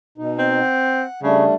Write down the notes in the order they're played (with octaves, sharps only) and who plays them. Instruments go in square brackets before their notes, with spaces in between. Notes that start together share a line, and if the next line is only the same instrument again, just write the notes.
[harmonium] B2 D#4
[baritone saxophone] C4
[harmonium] F#5
[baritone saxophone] C#3 [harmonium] G3 A3 D4